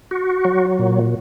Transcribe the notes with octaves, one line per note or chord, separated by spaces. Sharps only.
F#4
F#3
A#2